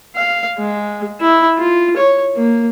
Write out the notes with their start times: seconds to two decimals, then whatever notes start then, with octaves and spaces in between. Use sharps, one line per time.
0.15 F5
0.58 G#3
1.21 E4
1.58 F4
1.96 C#5
2.36 A#3